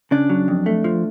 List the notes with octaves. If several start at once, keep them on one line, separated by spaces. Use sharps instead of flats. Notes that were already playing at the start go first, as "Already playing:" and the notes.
C#3 D4
F#3
F2
A3
F3